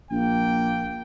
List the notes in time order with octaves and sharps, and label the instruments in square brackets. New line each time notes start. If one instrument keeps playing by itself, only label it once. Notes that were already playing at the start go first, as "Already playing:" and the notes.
[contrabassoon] A#1 [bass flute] A#3 [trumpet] G5